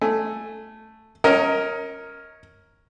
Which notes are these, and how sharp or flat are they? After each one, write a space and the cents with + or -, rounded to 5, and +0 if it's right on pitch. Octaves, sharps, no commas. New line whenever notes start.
A3 +0 G#5 +0
C#4 -10 A#4 +0 D#5 +25